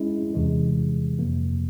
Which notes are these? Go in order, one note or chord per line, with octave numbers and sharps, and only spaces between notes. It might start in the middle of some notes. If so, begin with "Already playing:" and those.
Already playing: G#3 C#4 E4
E2 C3 E3 G#3
F2 C3 F3 A#3